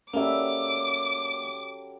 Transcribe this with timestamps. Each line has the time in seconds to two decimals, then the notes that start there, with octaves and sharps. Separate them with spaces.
0.14 F#3 G3 A#3 C#4 A4 E5 D6